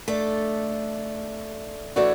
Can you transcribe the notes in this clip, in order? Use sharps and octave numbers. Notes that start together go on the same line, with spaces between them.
A3 D4 A4
E3 A3 D4 F#4 C#5